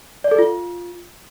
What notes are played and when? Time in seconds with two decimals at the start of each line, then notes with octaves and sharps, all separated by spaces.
0.24 D5
0.31 A4
0.39 F4